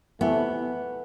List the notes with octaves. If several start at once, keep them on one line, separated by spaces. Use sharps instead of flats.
F2 C3 E3 A3 B3